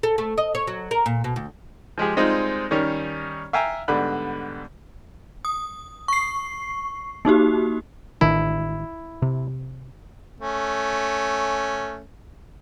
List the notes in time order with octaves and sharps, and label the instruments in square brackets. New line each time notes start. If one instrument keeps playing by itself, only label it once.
[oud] A4
A3
D#5
C#5
F#3
A#4
A#2
B2
D2
[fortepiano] F3 G#3 G4 G#4
G3 G#3 C4 D#4 F4
D#3 G3 C#4 D#4 A#4 C#5
E5 F5 G5 G#5 A#5 E6
G#2 D3 G3 B3 B5 F#6
[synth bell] D#6
C#6 C7
A#3 D#4 F#4 G4
[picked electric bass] A1 D#3 D4 [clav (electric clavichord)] E4
[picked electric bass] C3
[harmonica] A3 C#4